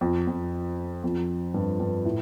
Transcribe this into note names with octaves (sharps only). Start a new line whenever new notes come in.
F2
F2
F2
G2
G2
A2